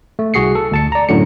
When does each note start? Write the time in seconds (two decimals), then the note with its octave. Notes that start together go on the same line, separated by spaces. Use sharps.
0.19 A3
0.34 C2 F#4 G#4 C7 C#7
0.55 A4
0.71 D2 A5 C#7
0.92 D5 A#5
1.09 F#2 A2 D3 F#3 C#7